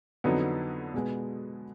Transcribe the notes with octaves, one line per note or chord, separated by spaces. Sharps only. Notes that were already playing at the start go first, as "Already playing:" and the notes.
F2 D3 F#3 B3 D#4
B2 G#3 B3